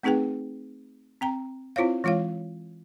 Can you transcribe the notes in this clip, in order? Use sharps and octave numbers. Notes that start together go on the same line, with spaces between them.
A3 C4 D#4 G#4 B4 G5
C4 G5 A#5
C4 E4 F4 C5 C#5 F5
E3 G#3 F4 C#5 F5